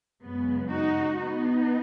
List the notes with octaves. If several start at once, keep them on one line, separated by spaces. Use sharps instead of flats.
F#2 C#3 G#3 B3
D#4 F#4
B3 D#4